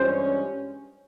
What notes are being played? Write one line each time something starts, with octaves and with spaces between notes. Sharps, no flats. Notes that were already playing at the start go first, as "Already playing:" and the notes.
Already playing: G2 E3 G#3 C#4 C5